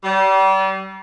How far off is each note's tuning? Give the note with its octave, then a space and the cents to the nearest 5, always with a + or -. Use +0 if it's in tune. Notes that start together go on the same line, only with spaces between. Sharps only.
G3 -35